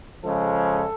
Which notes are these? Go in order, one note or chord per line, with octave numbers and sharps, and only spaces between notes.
C#3 F3 G#3 A4